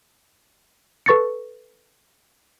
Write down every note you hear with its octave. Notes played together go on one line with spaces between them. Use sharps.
A4 B4 C#6 A6 A#6 C#7